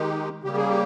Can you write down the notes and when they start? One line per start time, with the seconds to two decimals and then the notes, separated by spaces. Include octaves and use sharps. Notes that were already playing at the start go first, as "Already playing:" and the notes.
Already playing: D#3 G#3 D#4 G4
0.44 C#3 G3 A#3 G4
0.57 G#4
0.68 G4